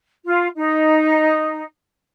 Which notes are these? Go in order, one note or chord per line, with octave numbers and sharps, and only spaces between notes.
F4
D#4